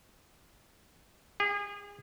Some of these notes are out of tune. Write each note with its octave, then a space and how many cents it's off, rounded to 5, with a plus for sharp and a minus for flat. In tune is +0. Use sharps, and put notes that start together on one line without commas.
G#4 -35